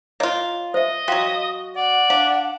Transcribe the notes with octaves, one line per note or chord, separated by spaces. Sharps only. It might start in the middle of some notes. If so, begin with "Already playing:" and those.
A#3 F4 C#5 D#5
C5 D#5 E5
F#3 F#4 F5 G5 C6
D5 F#5
D4 F5